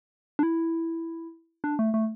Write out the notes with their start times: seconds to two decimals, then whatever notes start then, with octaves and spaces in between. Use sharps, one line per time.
0.39 D4
0.43 E4
1.64 D4
1.79 A3
1.94 A3